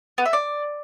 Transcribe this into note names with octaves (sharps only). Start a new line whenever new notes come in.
B3
E5
D5